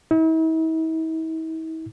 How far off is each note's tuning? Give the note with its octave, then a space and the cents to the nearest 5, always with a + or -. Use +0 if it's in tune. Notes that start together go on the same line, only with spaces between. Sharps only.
E4 -45